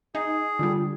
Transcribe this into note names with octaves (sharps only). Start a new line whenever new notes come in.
D#4 G#4
D3 G3 F4